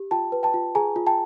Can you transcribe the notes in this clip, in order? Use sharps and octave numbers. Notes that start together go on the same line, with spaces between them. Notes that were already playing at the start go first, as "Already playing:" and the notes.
Already playing: G4
F4 G5 A5
B4
G5 A5
F4
G#4 G#5 A#5
F4
G5 A5